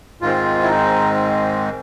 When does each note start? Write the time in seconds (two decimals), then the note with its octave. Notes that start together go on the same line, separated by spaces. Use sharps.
0.21 G#2 D#3 G#3 C4 F4
0.63 E4
0.67 D#4